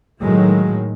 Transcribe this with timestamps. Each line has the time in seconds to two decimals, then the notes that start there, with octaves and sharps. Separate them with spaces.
0.20 A2 D#3 F#3 G#3